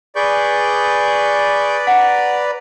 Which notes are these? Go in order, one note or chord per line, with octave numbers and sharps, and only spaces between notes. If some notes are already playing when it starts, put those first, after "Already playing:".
G#4 B4 D5 C#6 G6
F#5 A#5